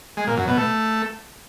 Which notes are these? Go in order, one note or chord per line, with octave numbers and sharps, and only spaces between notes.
G#3
A#2
F#2
B2
A3